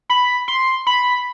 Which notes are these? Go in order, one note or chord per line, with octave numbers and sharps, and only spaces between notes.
B5
C6
B5